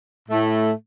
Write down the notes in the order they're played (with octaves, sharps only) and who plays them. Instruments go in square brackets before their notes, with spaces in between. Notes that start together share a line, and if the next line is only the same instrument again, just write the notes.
[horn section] A2 A3